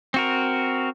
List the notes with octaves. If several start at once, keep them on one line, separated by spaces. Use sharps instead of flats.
C4 F#4 A#4